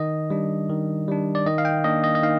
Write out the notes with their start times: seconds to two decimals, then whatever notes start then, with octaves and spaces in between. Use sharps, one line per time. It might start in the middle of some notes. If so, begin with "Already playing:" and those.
Already playing: D#3 D#5
0.30 G3 D4
0.69 D#3
1.08 G3 D4
1.35 D5
1.46 D#3 D#5
1.58 F5
1.65 G5
1.84 A#3 D4 D#5
2.04 D#5
2.15 D#5
2.23 D#3 F5